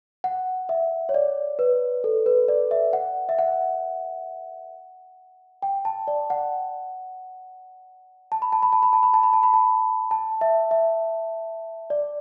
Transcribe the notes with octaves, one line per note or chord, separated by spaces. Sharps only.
F#5
E5
C#5
D5
B4
A4
B4
D5
E5
F#5
E5
F#5
G5
A5
D5
F#5
A5
B5
A5
B5
A5
B5
A5
B5
A5
B5
A5
B5
A5
A5
E5
E5
D5